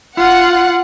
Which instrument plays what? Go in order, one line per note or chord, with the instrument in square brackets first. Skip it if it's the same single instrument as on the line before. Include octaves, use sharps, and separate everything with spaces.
[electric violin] F4 [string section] F#5